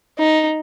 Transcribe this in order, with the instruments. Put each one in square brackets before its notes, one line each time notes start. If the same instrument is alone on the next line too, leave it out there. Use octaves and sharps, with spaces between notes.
[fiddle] D#4